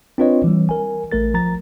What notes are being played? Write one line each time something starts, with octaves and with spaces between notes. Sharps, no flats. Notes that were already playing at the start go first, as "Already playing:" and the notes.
C4 D4 F4 B4 C#5 D#5
E3 G3
A#4 G#5
A1 A3 A#4 A6
F3 A#5 A6